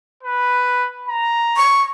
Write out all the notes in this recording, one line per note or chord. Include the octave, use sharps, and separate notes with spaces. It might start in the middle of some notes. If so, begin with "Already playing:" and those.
B4
A#5
C#6